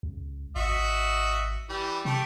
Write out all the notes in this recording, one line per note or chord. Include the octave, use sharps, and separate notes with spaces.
C#2
G#1 F#4 D#5 E5
E3 G3
C3 A3 G4